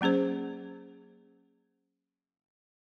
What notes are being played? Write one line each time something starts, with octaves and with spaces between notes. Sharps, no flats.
F#3 A#3 C#4 G#4 C5